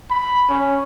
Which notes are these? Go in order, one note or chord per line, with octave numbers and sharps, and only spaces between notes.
B5
C#4